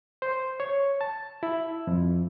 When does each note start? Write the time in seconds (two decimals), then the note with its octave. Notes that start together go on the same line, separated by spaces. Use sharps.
0.22 C5
0.60 C#5
1.01 A5
1.43 E4
1.87 F2